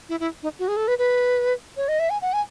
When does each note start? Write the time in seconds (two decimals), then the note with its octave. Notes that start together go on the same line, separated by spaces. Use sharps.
0.09 E4
0.20 E4
0.43 D#4
0.59 F#4
0.68 G#4
0.77 A4
0.88 B4
0.98 B4
1.77 C#5
1.88 D#5
1.99 E5
2.10 G#5
2.22 F#5
2.33 G#5